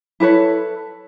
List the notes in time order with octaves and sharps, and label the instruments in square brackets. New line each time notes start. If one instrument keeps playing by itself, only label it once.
[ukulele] E4 A4 B4 C#5